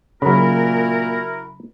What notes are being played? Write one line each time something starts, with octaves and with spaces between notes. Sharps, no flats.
A#2 C#3 F#3 E4 F#4 A#4 A#5 B5